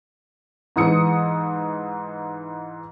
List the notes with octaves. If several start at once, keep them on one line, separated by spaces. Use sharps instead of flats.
G#2 E3 D#6 C#7